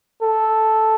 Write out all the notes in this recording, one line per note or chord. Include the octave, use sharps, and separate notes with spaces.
A4